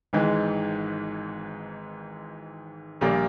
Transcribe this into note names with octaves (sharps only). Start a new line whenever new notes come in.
G#1 G#2 E3 G#3
A#1 A#2 G3 A#3